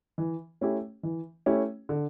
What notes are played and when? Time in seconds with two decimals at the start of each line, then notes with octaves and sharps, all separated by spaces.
0.18 E3
0.61 A3 C#4 E4 G4
1.03 E3
1.46 A3 C#4 E4 G4
1.89 D3